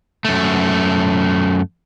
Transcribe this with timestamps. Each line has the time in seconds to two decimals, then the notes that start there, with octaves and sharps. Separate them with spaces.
0.25 F#2 A3